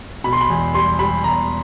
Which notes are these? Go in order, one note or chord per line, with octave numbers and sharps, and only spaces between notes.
B2 B5
C6
B5
E2
G3 C6
G3 B5
E2 A#5